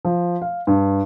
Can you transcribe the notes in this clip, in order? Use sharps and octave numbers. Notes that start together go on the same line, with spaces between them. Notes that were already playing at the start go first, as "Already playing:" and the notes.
F3
F5
G2